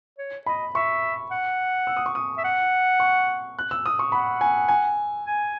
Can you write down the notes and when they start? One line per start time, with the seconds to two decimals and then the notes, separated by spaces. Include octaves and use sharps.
0.18 C#5
0.46 D#5 B5
0.75 E5 C#6
1.31 F#5
1.87 E6
1.97 D#6
2.06 C#6
2.15 D#6
2.38 E5
2.44 F#5
3.00 C#6
3.59 F#6
3.71 E6
3.86 D#6
3.99 C#6
4.12 F#5 B5
4.41 G#5
4.68 G#5
5.26 G#5